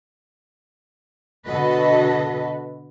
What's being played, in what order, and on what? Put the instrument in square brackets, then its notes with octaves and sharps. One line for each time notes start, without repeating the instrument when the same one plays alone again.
[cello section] B2 D3 F#4 A4 B4 D#5